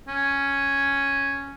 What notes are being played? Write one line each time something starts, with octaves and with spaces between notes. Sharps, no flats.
C#4